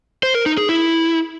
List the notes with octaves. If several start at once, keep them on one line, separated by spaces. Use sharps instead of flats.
C5
A#4
D#4
G#4
E4